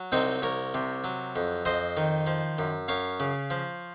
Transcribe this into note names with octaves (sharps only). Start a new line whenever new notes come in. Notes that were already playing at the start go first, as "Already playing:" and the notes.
Already playing: F#3
C2 C4 D#4
C2 A#4 C#5
C3
F#3
F2
F2 C5 D#5
D#3
F3
F#2
F#2 C#5 F5
C#3
F3